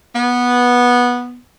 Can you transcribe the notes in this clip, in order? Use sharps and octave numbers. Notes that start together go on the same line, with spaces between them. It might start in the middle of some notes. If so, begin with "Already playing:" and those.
B3